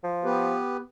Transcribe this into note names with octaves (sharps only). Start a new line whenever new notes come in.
F3
B3 G4 B4